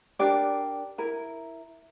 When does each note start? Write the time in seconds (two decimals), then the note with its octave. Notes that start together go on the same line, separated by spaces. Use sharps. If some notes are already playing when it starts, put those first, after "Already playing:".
0.19 D4 G4 A#4 D5
0.98 E4 A#4